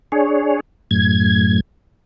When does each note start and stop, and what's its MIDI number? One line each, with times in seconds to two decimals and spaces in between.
0.12 0.60 62
0.12 0.60 68
0.12 0.60 73
0.91 1.60 42
0.91 1.60 45
0.91 1.60 92